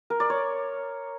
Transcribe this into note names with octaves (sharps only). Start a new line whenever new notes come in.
A#4
D5
C#5